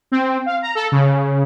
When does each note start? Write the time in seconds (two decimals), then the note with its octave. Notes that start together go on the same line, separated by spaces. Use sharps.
0.12 C4
0.46 F5
0.62 A#5
0.75 A4
0.92 C#3